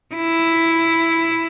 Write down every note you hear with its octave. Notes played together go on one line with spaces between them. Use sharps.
E4